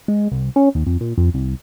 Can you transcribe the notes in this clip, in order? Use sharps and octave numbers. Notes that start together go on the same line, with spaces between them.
G#3
C2
C#4
D#2
F2
A#2
F2
C2